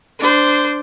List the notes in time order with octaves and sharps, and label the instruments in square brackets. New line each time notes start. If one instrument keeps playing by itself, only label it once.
[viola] D4 C5